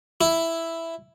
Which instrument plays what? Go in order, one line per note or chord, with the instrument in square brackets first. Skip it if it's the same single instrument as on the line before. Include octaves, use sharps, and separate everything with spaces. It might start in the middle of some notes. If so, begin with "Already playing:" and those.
[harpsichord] E4